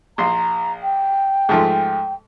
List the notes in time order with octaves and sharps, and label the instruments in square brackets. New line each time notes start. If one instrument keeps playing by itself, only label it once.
[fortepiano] A#1 C6 [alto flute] A#5
[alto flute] G5
[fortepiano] G#2 F3 A3